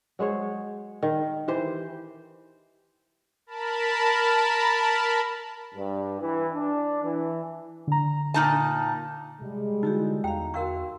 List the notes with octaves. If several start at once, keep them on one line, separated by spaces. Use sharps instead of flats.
F#3 G#3 C5 C#5
D#3
E3 G4 C5
A#4 A5 B5
G2
E3
D4
E3
D3 A#5
A#2 D#4 A5
C3 G3 G#3
D3 D#4 E4 F#4 G4
E2 F5 G5 A#5
F#4 A#4 F5 C6 C#6 E6